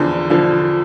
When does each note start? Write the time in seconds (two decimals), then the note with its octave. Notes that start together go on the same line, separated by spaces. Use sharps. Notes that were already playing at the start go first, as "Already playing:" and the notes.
Already playing: E2 D3 F3
0.30 D3 F3